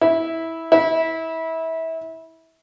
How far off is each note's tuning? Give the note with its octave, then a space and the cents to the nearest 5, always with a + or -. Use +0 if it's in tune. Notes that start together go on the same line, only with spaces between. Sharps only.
E4 -15
E4 -25